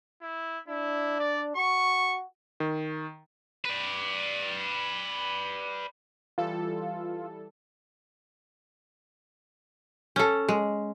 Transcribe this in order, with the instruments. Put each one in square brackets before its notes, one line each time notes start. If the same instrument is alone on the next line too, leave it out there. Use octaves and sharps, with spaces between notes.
[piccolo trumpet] E4
[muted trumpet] D4 [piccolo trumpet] E4
[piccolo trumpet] D5
[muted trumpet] F#4 [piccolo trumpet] C#6
[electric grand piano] D#3
[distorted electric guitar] B4 D5
[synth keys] E3 G3 A4 [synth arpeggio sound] F4
[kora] C#4 A4
G#3